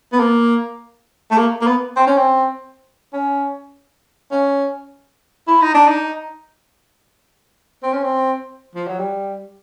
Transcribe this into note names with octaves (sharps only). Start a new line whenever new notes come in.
B3
A#3
A3
A#3
A#3
B3
C4
C#4
C4
C#4
C#4
E4
D#4
D4
D#4
C4
C#4
C4
F3
F#3
G3